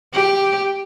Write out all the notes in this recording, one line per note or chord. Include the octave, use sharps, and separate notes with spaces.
G4